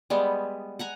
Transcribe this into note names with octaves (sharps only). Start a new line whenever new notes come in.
G3 G#3 B3
F#5 G#5 A#5